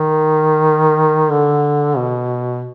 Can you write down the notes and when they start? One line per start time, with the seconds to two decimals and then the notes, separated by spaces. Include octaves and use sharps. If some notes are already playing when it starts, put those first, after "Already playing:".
Already playing: D#3
1.31 D3
1.97 B2